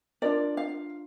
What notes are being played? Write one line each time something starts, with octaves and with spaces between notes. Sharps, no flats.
D4 F4 A#4 D5
F5